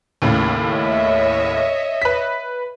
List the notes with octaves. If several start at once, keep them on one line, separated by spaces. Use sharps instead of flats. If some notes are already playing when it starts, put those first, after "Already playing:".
D#2 A2 C#3
C#5 D#5 E5
B4 B6